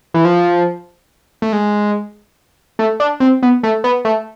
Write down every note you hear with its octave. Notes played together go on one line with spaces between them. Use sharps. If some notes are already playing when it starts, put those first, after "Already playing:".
E3
F3
A3
G#3
A3
D4
C4
B3
A3
B3
A3